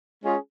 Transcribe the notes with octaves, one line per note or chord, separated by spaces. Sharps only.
G#3 C#4 F4 G#4